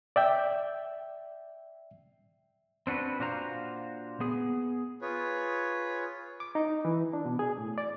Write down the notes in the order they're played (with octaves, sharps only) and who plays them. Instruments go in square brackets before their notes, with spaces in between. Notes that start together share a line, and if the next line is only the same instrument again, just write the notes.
[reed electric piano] D5 E5 G5
[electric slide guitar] C4 D4 F#4 B4
A#2 D4 F#4 C5 F5 A#5
B3 G#4
[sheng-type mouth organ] F4 G#4 B4 C#5
[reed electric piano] D6
D#4
E3
D4
B2
G#4
A2
D5